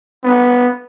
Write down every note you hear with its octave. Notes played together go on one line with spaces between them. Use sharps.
B3